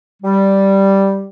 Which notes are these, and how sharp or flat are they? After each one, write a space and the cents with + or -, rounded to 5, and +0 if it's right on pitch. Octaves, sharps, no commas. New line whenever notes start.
G3 -5